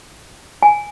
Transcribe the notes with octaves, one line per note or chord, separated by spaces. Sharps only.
G#5